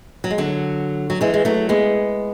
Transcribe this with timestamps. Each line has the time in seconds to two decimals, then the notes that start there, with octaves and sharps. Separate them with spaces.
0.24 F#3
0.31 G#3
0.38 D3 F#3
1.10 F#3
1.21 E3 G#3
1.34 G#3
1.45 F#3 A3
1.69 G#3 B3